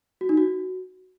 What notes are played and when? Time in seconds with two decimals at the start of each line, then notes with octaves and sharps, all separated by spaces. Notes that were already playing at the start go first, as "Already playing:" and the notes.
0.21 F#4
0.29 D#4
0.37 F#4